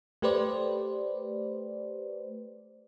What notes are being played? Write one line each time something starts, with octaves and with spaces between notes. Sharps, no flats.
A3 G4 B4 C5 D5